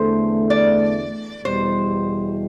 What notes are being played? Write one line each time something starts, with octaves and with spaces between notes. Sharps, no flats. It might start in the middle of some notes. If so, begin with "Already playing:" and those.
Already playing: E2 D3 A3 C5
D5
E2 B2 G3 C5